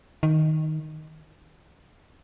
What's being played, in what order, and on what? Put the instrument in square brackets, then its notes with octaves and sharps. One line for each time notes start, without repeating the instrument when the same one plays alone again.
[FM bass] D#3